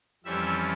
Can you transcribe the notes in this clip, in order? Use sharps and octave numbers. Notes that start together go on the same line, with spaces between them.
F2 E3 G3 C#4 E5